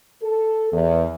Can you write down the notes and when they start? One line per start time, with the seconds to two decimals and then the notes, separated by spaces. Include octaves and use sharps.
0.23 A4
0.72 E2